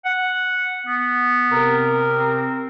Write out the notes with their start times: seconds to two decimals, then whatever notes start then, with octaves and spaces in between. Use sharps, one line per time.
0.05 F#5
0.86 B3
1.51 C3 A#4
2.16 C4